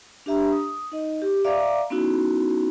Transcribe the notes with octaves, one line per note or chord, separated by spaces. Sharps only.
D4 G4 E5 A#5
D#6
D#4 D#5
G4
D5 E5 F5 A#5 D6
B3 C#4 D#4 E4 F#4